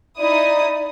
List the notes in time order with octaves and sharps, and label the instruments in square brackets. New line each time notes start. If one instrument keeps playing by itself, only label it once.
[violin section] D#4 E4 D#6 [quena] D5